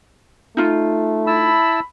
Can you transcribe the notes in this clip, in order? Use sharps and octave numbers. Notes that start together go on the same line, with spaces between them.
A3 D#4 F4
E4 A5 B5 E6